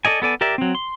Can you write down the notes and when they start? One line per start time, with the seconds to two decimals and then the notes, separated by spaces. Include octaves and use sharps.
0.05 A4 D5 D#5 G#5
0.22 B3 A4 D5 G#5
0.41 G4 A#4 D5 E5
0.58 F#3 C4
0.75 C6